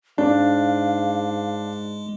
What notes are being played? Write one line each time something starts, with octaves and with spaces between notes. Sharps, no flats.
G#2 G#3 D4 F5